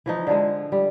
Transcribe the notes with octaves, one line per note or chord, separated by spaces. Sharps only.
E3 F3 D#4
D3 F3 G#3
G3